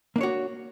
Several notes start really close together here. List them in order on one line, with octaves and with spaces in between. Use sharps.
A#3 D4 C#5 F#4